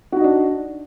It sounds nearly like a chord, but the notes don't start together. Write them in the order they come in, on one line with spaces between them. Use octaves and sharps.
F#4 D#4 D#5 D4